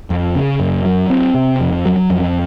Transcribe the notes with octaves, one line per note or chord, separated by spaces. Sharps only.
F2
C#3
F#2
F#3
C4
C3
F2
F#3
F2